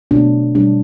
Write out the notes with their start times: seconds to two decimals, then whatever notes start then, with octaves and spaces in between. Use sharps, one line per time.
0.11 B2 F#3 A3 D4
0.55 B2 G3 D4